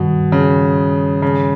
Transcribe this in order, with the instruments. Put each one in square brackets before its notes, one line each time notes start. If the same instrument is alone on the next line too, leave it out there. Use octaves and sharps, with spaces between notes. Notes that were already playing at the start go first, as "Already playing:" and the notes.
Already playing: [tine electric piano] G2 D#3 G3 [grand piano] B2
[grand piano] C#3
C#3